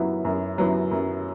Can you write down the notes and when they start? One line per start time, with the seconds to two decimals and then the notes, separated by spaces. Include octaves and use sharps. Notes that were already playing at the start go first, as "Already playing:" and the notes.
Already playing: F#2 F#3 B3 E4
0.25 F#2
0.58 F#3 B3 E4
0.91 F#2